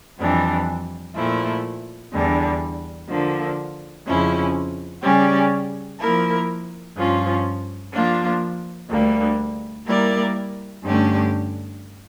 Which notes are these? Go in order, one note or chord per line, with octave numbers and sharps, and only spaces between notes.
F2 E3 G3 D4
A#2 F3 A3 E4
E2 D3 G3 D4
D3 F3 A#3
F2 C#3 F3 C#4 E4
C#3 G3 C#4 G4 D5
F3 A#3 E4 A#4
G2 F3 C#4 F4
F3 A#3 D4 F4
D2 D3 G3 A#3
G3 A#3 E4 A#4 D5
G2 D3 A3 C#4 G4